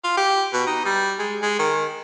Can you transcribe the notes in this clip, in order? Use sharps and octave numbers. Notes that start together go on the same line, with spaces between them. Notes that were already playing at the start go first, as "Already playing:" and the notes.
F4
G4
B2
D#4
G3
G#3
G#3
D#3